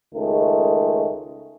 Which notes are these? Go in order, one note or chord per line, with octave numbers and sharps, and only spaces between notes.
C#2 D#3 G#3 A3